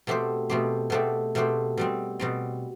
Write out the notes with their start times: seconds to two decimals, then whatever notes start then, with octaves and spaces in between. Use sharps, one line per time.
0.07 B2 A3 C4 G4 C5
0.49 B2 A3 C4 G4 C5
0.90 B2 A3 C4 G4 C5
1.35 B2 A3 C4 G4 C5
1.77 B2 G3 C4
2.19 B2 G3 C4